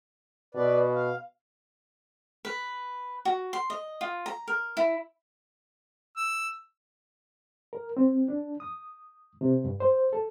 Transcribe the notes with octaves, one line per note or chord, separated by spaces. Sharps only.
B2 B4 D5
F5
B4
F#4
C6
D#5
F4
A#5
A#4
E4
E6
A#4
C4
D4
D#6
C3
G2
C5
A4